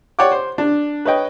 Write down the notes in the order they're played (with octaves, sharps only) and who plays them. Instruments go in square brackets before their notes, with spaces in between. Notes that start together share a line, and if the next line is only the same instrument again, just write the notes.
[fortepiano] C#5 D5 F#5 G5 D6
C5
D4
B4 C#5 D#5 G5